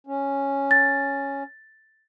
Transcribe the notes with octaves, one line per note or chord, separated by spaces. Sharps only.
C#4
A6